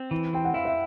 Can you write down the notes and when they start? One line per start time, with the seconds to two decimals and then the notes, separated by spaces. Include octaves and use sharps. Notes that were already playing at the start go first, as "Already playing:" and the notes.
Already playing: C4
0.11 E3
0.33 C4 G5
0.45 F#5
0.54 E4 F5
0.65 E5